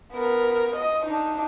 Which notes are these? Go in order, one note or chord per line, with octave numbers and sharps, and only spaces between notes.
B3 A#4
D#5
D4 D#4